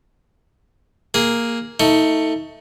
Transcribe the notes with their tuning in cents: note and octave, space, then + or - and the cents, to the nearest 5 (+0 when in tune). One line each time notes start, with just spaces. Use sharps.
A#3 +0 G#4 +0
A3 +20 D#4 +35